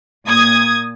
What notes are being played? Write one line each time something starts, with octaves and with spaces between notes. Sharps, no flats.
A#2 D#6 G#6